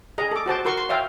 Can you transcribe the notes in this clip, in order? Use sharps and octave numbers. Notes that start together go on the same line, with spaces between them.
G#4 D#5 A#5
A4 D6
F#4 C5 A5 D6
F#4 A#4 C6 C#6
C6
C#5 E5 F5 G5